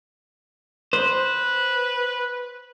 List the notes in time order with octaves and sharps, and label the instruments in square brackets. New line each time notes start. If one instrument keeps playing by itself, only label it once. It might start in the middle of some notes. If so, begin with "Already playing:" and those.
[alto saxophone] B4 [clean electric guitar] C5